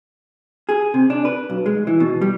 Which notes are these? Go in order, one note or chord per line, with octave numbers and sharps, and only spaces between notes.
G#4
C3
D4
B4
B1
G#3
E3
B2
G3